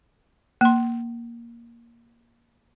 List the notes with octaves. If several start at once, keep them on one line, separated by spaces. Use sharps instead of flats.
A#3 C6